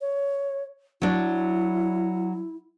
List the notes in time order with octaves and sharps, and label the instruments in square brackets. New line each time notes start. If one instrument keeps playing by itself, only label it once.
[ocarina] C#5
[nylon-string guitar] F#3 D4 [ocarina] E4